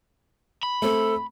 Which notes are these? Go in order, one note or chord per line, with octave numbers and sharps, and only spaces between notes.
B5
A3 C4 A4